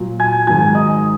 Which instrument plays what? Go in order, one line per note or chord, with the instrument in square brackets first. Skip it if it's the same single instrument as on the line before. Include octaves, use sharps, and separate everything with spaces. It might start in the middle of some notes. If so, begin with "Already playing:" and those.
Already playing: [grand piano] A#2 F#3
G#5 G#6
G#2 D#3 F#3 G#5 G#6
D#5 D#6